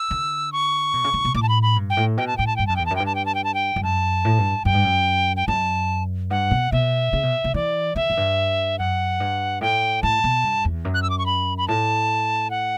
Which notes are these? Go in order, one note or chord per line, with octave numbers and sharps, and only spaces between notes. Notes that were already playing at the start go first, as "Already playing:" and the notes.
Already playing: E6
D3
C#6
B2
C#3
D3
B2
A2 D6
A5
B5
B5
G2
G5
A2
B2 G5
A5
A2 G5
A5
G2 G5
F#2 A5
E2 G5
F#2 A5
G2 G5
A5
G5
A5
G5
A5
G5
G2
F#2 A5
A2
G2
F#2 G5
G2
F#2
G5
F#2 A5
G2 F#5
B2
B2 E5
C#3
B2
C#3
E3 D5
D3 E5
F#2
G2
F#2 F#5
G2
A2 G5
A2 A5
B2
G2
E2
F#2
F#6
E6
D6
C#6
B5
B5
A2 A5
F#5